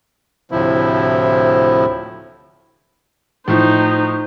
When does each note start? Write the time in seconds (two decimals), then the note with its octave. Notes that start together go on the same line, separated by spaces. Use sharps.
0.52 D2 A2 C3 F3 E4
3.48 A2 F3 D#4 E4 C5